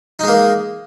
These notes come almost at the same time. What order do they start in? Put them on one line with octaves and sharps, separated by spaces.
D#4 G#3 A#3